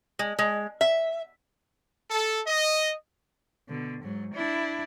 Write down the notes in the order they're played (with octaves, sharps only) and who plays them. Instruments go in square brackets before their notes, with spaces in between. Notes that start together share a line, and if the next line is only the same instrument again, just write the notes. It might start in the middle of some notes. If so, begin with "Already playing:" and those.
[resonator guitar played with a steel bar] G#3
G#3
E5
[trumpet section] A4
D#5
[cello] B2 D3
G#2 F#3
D4 E4